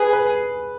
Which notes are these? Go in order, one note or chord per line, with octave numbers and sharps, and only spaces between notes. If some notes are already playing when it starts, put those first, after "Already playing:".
Already playing: G#4 B4
B4